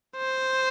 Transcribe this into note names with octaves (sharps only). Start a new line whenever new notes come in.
C5